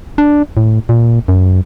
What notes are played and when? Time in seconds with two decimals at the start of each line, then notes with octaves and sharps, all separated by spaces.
0.18 D4
0.57 A2
0.89 A#2
1.28 F#2